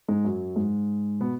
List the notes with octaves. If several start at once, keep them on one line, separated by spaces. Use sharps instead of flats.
G#2 G#3
F#2 F#3
G#2 G#3
B2 B3